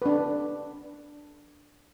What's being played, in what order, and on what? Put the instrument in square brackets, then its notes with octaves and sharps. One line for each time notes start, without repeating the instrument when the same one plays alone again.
[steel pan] D4 B4